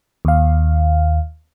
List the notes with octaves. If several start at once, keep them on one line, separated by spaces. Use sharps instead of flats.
D#2 F5